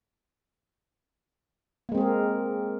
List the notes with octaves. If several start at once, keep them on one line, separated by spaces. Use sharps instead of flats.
G#3 A#3 C4 G#4 A#4